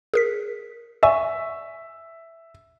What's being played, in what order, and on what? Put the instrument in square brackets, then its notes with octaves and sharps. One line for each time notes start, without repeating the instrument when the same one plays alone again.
[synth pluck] G#4 A#4 B6
[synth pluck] D5 G#5 C#6 [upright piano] E5